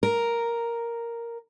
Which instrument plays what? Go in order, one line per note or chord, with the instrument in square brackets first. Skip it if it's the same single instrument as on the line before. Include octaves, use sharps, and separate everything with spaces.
[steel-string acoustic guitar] A#4